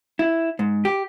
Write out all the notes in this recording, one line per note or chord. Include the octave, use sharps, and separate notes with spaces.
E4
G#2
G4